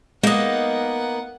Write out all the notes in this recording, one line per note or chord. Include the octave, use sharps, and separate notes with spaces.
G#3 A#3 B3 D#4 D#5 F#5